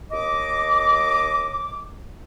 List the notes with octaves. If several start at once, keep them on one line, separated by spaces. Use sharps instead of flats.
D#2 D#5 D6